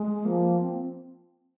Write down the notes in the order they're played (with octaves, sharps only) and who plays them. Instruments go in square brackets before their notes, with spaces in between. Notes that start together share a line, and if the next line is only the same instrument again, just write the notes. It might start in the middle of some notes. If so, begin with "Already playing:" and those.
Already playing: [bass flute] G#3
[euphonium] F3 [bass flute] A#3
[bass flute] C4